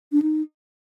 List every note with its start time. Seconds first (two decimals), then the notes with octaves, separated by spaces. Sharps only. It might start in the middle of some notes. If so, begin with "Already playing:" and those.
0.12 D4
0.22 D#4